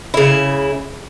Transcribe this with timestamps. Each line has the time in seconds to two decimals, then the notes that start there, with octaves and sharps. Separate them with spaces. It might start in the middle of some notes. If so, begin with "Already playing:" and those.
0.14 C#3 E4